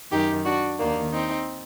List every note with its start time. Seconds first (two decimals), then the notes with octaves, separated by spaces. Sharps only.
0.11 F#2 D#3 D#4 G4
0.45 D4 F#4
0.78 D#2 D#3 A#3 D4
1.12 C4 D#4